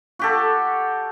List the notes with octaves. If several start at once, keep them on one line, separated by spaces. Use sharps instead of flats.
F#4 G4 A4